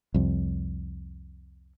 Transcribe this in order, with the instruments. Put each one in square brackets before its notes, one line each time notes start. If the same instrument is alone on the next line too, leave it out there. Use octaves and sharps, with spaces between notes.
[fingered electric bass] C2 F2